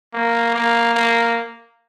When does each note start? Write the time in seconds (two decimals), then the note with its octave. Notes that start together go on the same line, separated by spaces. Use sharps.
0.14 A#3
0.55 A#3
0.95 A#3